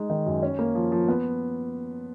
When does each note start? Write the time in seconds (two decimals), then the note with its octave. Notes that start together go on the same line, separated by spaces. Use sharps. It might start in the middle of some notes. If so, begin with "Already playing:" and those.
Already playing: G#3 D#4
0.10 D#3
0.26 F#2
0.43 C#4
0.59 A#3
0.75 F3
0.92 F3
1.08 B3